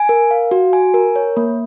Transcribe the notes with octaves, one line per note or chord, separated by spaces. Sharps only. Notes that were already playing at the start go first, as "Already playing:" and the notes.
Already playing: G#5
A#4
F5
F#4
G#5
A#4
C#5
A#3